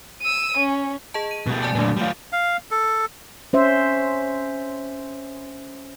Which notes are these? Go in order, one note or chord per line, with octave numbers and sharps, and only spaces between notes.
E6 D#7
C#4
G#4 D#5 A5
D#7
B2 G3
D5 G#5 A5
A#2 D3 F#3 A3
G3 F4
F5
A4
C#4 C5 E5